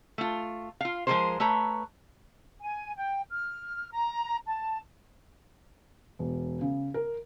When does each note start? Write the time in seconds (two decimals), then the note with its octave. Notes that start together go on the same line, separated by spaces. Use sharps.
0.18 A3 F4
0.81 F4 F5
1.07 F3 G#3 A3 G#4 A#4 C5
1.40 A3 B4 C#5 A#5
2.61 G#5
2.96 G5
3.31 F6
3.92 A#5
4.46 A5
6.19 E1
6.61 C#3
6.94 A#4